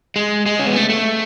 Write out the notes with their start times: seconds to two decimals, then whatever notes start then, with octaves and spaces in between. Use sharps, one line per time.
0.16 G#3
0.46 G#3
0.59 C#4
0.66 B3
0.76 A3
0.90 A3